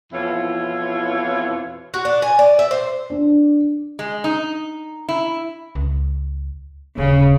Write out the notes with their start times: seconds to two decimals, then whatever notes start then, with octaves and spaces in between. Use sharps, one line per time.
0.12 F2 B2 E3 E4 F4 C#5
1.94 F#4
2.05 D4
2.22 G#5
2.39 D5
2.59 E5
2.71 C5
3.10 D4
3.99 G#3
4.24 D#4
5.08 E4
5.75 C#2
6.98 D#1 C#3